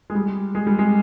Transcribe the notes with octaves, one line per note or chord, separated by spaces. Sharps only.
G#3
G3
G#3
G3
G#3